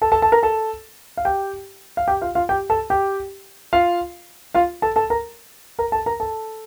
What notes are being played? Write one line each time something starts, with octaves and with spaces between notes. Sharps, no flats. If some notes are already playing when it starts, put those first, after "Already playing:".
A4 A5
A4 A5
A4 A5
A#4 A#5
A4 A5
F5
G4 G5
F5
G4 G5
F4 F5
F4 F5
G4 G5
A4 A5
G4 G5
F4 F5
F4 F5
A4 A5
A4 A5
A#4 A#5
A#4 A#5
A4 A5
A#4 A#5
A4 A5